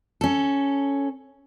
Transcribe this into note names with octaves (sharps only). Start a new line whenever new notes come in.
C#4 A4